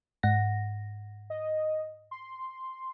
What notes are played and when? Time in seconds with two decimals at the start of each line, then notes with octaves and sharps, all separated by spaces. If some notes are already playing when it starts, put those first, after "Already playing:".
0.23 G#2 F#5 A#6
1.30 D#5
2.11 C6